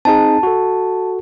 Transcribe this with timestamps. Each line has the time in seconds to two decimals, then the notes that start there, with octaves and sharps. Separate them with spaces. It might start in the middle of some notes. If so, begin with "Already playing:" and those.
0.05 C4 D#4 G#4 A5
0.43 F#4 A4